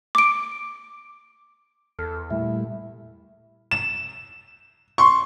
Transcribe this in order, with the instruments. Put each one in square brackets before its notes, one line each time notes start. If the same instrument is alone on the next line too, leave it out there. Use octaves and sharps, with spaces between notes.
[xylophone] D6 D7
[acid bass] E2 [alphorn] A4 [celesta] F6
[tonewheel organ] A#2 G3 A3 [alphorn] E4 [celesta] E5
[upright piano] E7
C6 C#6